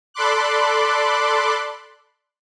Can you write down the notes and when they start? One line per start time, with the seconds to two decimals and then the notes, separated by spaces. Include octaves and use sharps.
0.14 A4 D5 B5 C6 D6 F#6